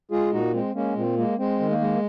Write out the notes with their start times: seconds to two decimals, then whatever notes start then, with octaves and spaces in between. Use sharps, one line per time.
0.11 G#3 F4 G#4
0.32 A#2 D#4 F#4
0.54 G#3 C4
0.75 G#3 A#3 C#4
0.96 A#2 C4
1.17 G#3 A#3
1.38 G#3 C4
1.60 D#3
1.71 A#3
1.81 G#3